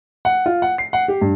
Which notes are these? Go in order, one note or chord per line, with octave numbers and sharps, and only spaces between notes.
F#5
F4
F#5
C7
F#5
G4
G2